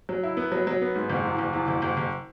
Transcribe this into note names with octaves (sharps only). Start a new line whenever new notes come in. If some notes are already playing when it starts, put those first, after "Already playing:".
F#3
E4
B3
F#3
F#3
B3
G#2
F#1
E2
F#1
E2
F#1
F#1
F#1